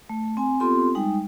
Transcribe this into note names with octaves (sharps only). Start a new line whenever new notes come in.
A3
C4 G#5
B3 C4 F4 G4 A4 C6
G3 G#3 D#4 G5